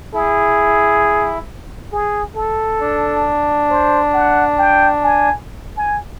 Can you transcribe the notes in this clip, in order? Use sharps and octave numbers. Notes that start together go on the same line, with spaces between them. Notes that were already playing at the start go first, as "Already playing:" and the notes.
E4 G#4
G#4
A4
D4
C5
F#5
G5
G#5
G#5